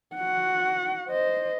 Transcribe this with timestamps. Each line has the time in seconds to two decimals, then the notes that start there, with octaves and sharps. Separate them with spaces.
0.15 F#4 F#5
1.09 C5 D#5